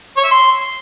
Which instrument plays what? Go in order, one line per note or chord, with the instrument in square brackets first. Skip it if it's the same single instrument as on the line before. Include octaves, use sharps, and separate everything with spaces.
[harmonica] C#5
E5
C6